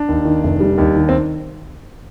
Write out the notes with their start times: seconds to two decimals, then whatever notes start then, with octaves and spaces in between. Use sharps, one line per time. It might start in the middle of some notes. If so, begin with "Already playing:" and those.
Already playing: D4
0.09 D#2
0.25 D#3
0.44 F1
0.60 G3
0.78 D#2
0.96 D#3
1.09 C4